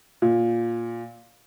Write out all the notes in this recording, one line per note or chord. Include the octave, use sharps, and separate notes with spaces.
A#2